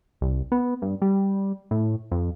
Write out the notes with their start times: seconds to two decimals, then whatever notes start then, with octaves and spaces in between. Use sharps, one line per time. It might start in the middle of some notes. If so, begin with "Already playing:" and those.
0.21 C2
0.52 B3
0.82 G2
1.02 G3
1.71 A2
2.11 F2